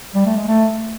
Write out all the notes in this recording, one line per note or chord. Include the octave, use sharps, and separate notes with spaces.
G3
A3
G#3
A3